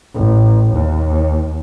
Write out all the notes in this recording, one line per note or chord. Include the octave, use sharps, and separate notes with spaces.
A1
D#2